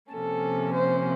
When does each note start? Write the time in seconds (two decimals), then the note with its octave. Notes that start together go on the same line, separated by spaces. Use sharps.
0.13 C3 F3 A#3 C#4 A4
0.74 C5